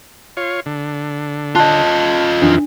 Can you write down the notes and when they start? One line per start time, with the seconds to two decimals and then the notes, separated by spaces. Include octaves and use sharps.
0.37 F4 C#5
0.66 D3
1.55 F4 D#5 A5 F#6
2.42 F2 D#3 E3 D4